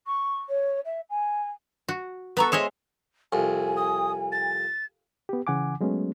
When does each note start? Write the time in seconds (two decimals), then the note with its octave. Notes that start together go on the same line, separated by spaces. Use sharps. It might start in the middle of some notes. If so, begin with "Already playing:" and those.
0.06 C#6
0.49 C#5
0.85 E5
1.09 G#5
1.89 F#4
2.37 B3 A4 B4 A#5 C#6
2.52 G#3 G#4 C5 C#5 D#5 E5
3.33 C2 F2 G#5
3.77 D#6
4.32 A6
5.29 B3 G4
5.47 C#3 E3 F#5 G#5 D6
5.81 F#3 G#3 A3 B3 C#4